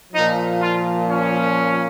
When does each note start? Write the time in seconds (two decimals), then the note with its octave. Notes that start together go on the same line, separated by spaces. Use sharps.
0.13 A#2 F3 D#4
0.60 F4
1.07 C#4